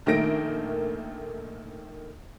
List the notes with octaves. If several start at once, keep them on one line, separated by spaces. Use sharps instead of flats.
A#1 D#3 A3 A#3 A#6 D7